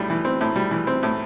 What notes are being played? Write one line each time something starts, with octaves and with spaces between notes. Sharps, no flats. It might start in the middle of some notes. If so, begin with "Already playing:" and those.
Already playing: A2 G3
E3
C4
A2
G3
E3
C4
A2